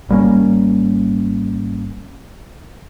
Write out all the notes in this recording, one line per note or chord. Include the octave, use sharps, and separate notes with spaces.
G#1 G3 A#3 C#4